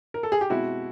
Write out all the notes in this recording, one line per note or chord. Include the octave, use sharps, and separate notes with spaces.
A#4
A4
G#4
G4
B2 G#3 C4 E4 F#4